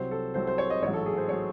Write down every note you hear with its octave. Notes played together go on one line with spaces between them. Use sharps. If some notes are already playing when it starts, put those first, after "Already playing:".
Already playing: C2 C3 F#3 C5
A4
C2 C3 F#3 C5
C5
C#5
D#5
A1 G#2 F#3 C#5
A4
G#4
C5
F#3 C#5